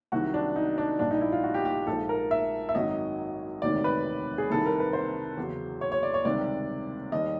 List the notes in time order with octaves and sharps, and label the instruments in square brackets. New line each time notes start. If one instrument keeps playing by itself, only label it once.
[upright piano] C2 C3 D#3 F#3 F#4
D4
D#4
D4
A#1 A#2 G3 D4
D#4
E4
F4
F#4
G4
G4
A#1 G#2 F3 A4
A#4
E5
E5
G#1 F#2 D#3 F#3 D#5
E1 D2 C3 D#3 D5
B4
G#4
C2 C3 D#3 A4
A#4
B4
C5
E2 C#3 F#3
C#5
C#5
D5
C#5
C#2 C3 D#3 G3 D5
D#2 D#3 G3 D#5